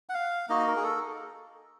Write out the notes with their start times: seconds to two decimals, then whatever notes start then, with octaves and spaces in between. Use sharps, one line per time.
0.09 F#5
0.14 F5
0.49 A#3 D#4 F#4 D#5
0.67 A#4
0.76 G#4
0.84 A4